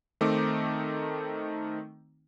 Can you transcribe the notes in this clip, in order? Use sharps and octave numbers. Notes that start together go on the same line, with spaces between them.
D#3 A3 C4 D#4 D6